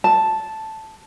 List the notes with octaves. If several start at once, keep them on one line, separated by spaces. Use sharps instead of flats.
A5